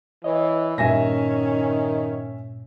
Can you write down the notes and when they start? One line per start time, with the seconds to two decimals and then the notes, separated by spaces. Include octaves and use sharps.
0.24 E3 C#5 D#5
0.78 G2 A#2 D#3 C#4 E5 G#5 A#6